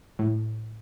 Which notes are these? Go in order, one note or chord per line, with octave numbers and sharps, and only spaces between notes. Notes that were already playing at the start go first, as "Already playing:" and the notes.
A2